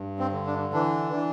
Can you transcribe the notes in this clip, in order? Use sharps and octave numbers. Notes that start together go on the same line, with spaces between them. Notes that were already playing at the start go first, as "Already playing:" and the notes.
Already playing: G2
C4
D3
D4
E3 D4
E3